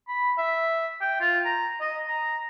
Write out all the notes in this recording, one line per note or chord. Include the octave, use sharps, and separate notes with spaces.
B5
E5
G5
F4
A#5
D#5
A#5